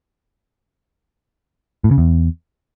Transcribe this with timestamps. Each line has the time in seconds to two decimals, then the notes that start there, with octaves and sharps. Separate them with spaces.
1.84 A2
1.91 C#3
1.98 E2